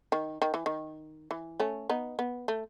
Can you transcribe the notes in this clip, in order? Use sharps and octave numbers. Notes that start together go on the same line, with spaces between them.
D#3
D#3
E3
D#3
E3
A3 C#4
B3 D#4
B3
A3